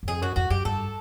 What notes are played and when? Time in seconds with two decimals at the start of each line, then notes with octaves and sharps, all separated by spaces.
0.03 F#2
0.08 F2 G#4
0.21 F#2 F#4
0.36 F2 F#4
0.50 F#2 G4
0.65 G2 A4